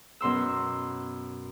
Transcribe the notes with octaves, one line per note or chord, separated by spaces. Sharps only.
F#2 B2 C6 E6